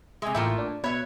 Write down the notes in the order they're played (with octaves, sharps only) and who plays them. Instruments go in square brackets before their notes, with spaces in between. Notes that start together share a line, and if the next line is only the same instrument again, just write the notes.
[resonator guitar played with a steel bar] C3 G#3 [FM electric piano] E5 G#5
[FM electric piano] A1 E4 G5 [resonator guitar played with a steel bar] A3 A#3 F4
[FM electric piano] D4
[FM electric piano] B2 B4 G#6 [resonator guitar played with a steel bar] C#5 E5